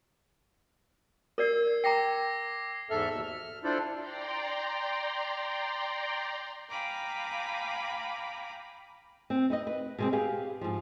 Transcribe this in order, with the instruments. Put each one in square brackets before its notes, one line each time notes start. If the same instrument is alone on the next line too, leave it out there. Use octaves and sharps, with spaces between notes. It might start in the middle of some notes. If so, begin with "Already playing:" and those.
[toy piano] A#4 D5 [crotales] E6 G#6 C7
[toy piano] G5 A#5 [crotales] D6 A#6 C7
[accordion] E2 G#2 A4 E5 F6
D#2 B2 E6
F6
D4 E4 F4 A4 C5 D5
[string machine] D5 G5 A#5 C6
[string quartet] F5 G5 G#5 A#5 B5 D6
[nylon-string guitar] C4
D#4 B4 D#5
B4
B2 G#3 C4
G4 G#4 B4 F5
G#2 F3